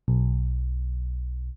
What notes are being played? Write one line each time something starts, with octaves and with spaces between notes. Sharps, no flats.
B1